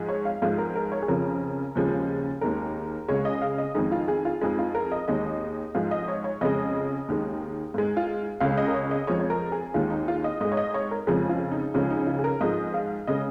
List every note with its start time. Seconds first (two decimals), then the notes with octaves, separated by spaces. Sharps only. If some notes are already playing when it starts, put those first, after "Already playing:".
Already playing: G#2 F3 G#3
0.09 C#5
0.25 F5
0.42 G#2 F3 G#3 F5
0.58 A#4
0.76 A#4
0.92 C#5
1.02 G#4
1.08 F2 C#3 F3 A#4
1.75 D#2 C#3 F3 G#3
2.41 D#2 D#3 G#3 A#4
3.09 C#2 C#3 G#3 C#5
3.25 D#5
3.42 F5
3.58 D#5
3.75 F2 D#3 G#3 D#4
3.92 F4
4.08 G#4
4.25 F4
4.41 F2 F3 G#3 D#4
4.59 F4
4.75 A#4
4.92 D#5
5.08 D#2 D#3 G#3 D#5
5.75 G#2 F3 G#3 F5
5.91 D#5
6.08 C#5
6.24 C#5
6.41 F2 C#3 G#3 D#5
7.08 D#2 D#3 G#3
7.74 G#2 G#3
7.97 F4
8.40 C#2 C#3 G#3 F5
8.57 D#5
8.67 A#4
8.74 C#5
8.91 D#5
9.07 F2 F3 G#3 C#5
9.19 C#5
9.30 A#4
9.52 G#4
9.74 D#2 D#3 G#3 F4
9.90 D#4
10.08 F4
10.24 D#5
10.41 G#2 G#3 D#5
10.52 C#5
10.57 D#5
10.74 C#5
10.91 A#4
11.07 F2 C#3 F3 G#3 G#4
11.29 F4
11.52 D#4
11.74 C#2 C#3 F3 G#3 C#4
11.90 D#4
12.07 F4
12.19 G#4
12.24 A#4
12.41 G#2 F3 G#3 D#5
12.74 F5
13.07 C#3 G#3 D#5